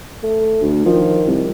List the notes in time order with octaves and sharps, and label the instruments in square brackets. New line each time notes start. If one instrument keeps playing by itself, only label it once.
[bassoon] A3
[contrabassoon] D2
[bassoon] D#3 [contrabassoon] F3
[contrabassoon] C2